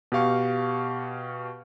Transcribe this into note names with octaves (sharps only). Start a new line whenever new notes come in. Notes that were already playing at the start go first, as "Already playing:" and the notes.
B2 G4 F5 C#6